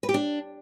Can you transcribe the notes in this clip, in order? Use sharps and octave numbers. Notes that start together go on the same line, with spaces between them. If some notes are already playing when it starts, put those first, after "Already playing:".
B4
G4
D4